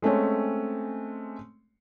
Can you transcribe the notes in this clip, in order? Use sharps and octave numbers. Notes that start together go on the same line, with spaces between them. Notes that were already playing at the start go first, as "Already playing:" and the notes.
G#3 A3 C4 C#4